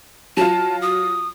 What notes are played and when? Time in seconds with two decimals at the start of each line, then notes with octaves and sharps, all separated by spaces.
0.37 F#3 F4 A5
0.82 D#6